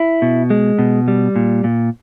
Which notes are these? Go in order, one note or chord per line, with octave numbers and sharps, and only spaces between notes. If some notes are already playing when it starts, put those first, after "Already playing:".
Already playing: E4
B2
G#3
B2
G3
A#2
A#2